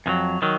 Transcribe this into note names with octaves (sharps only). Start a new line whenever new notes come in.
F2 D#3 F#3
D#3 F#3